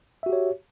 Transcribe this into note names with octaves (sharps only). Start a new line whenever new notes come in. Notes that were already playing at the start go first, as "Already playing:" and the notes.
F#4 G4 C#5 E5